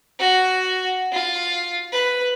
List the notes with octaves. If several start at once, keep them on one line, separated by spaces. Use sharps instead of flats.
F#4
F4
B4